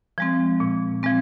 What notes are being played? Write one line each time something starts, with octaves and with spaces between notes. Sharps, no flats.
F3 G#3 C4
A#2
F3 G#3 C4